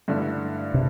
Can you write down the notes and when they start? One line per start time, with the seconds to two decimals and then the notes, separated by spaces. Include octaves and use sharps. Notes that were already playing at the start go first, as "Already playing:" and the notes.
0.08 G2 D3 A3 E4
0.74 C3